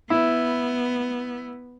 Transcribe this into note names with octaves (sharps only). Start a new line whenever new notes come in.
B3 E4